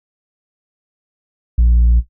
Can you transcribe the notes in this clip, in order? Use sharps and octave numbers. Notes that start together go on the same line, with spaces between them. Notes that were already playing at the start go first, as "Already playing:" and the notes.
A#1